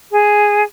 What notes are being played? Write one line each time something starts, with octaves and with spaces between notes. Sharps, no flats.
G#4